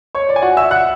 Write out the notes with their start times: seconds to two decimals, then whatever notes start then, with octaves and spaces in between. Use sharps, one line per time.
0.15 C#5 C#6
0.29 D5
0.36 G#5
0.42 F#4 F#5
0.57 E5 E6
0.71 F#5 F#6